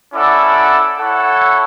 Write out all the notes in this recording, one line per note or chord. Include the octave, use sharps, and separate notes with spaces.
C#4 E4 A4 D5 F#5
E4 A4 C#5 F#5